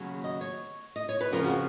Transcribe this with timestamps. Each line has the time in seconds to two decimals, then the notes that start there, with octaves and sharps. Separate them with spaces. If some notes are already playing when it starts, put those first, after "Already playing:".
Already playing: D#2 C#3 F#3
0.24 D#5
0.41 C#5
0.96 D#5
1.09 C#5
1.21 B4
1.32 F2 C#3 F3 A#4
1.44 F#4